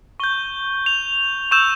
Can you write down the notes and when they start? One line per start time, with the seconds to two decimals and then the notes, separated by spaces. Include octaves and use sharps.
0.20 C#6 G6 G7
0.86 F7
1.51 C#6 E6 G6 E7